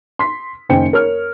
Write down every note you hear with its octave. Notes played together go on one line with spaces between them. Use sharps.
C6 B6
F#1 D#3 C#4 C5 G5 C#7
A#4 C#5 F6